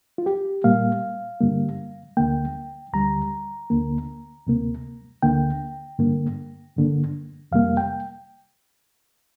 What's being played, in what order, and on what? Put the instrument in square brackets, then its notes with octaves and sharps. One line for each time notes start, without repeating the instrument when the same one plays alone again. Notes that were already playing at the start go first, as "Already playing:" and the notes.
[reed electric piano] F4
G4
A#2 G3 A#3 F5
G2 D3 G3 A#3
D2 D3 A#3 G5
D2 D3 G3 A#5
D2 D3 A#3
D2 C3 A#3
D2 D3 A#3 G5
G2 D3 A#3
G2 D3 A#3
F2 C3 G3 A#3 F5
G5